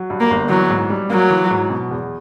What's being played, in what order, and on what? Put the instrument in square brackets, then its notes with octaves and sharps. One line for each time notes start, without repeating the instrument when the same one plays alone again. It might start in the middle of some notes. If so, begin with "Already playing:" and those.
Already playing: [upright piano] F#3
G2
[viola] A#3
[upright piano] G1
[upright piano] E3 [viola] F#3
[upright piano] G#2
G3
[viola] F#3 [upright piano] A#3
[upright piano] E3
G#2
B2
E2